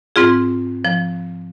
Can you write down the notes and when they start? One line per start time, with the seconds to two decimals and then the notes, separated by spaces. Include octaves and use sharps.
0.16 G#2 C4 F4 G#4
0.85 F3